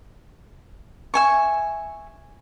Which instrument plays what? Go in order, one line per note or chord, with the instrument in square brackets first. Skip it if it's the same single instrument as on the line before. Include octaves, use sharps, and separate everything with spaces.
[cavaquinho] E5 G#5 C#6